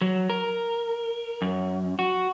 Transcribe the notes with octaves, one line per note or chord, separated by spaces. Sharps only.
F#3
A#4
F#2
F#4